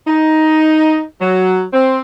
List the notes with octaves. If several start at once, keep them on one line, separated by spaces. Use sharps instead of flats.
D#4
F#3
C4